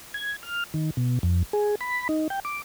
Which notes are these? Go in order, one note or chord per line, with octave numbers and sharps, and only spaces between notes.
G#6
F6
D#3
B2
F2
G#4
B5
D#4
G5
D6